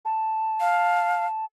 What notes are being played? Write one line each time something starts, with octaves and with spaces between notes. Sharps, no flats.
A5
F5